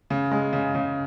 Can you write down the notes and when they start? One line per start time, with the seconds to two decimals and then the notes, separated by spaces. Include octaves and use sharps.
0.10 C#3
0.31 G#3
0.53 C#3
0.75 C#3